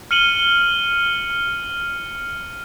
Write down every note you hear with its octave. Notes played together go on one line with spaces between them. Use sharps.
F6 C#7 D#7 F#7 G7